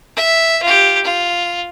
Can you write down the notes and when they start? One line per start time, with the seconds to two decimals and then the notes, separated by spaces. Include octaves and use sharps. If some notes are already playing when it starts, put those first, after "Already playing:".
0.17 E5
0.63 F4 G4
1.04 F4